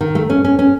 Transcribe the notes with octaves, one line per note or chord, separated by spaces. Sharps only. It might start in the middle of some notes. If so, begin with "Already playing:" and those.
D#3
A3
C#4
C#4
C#4